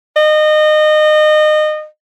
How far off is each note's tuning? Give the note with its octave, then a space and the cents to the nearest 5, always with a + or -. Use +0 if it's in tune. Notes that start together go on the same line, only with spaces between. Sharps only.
D#5 -25